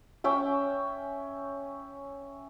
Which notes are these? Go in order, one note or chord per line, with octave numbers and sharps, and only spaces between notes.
C#4 E5 G5